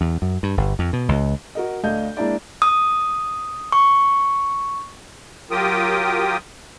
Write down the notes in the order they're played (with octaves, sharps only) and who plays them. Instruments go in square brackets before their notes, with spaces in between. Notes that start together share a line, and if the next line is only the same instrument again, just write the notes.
[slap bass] E2
F#2
G2
G1
F2
B2
C#2
[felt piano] F#4 A#4 D#5
D2 A3 D4 D#5 F5 G6
G#3 A#3 D4 E4 D5
[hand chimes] D#6
C#6
[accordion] F#3 F4 G4 A#4 G5 D#6